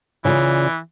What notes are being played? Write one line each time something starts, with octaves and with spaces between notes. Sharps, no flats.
C#3 E3 F4 D5